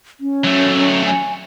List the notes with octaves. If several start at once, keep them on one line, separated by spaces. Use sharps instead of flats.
C#4
F#3 A3
G#5